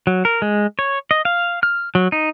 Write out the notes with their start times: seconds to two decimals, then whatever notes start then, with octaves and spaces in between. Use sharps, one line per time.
0.07 F#3
0.25 A#4
0.42 G#3
0.79 C#5
1.11 D#5
1.25 F5
1.63 F6
1.95 F#3
2.12 D#4